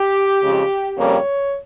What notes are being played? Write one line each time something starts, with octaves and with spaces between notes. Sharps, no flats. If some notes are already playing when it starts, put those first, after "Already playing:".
Already playing: G4
F2 C#3 G#3
F2 C#3 G3 A#3 C#5